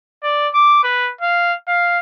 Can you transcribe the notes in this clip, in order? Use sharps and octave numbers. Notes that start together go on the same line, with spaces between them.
D5
D6
B4
F5
F5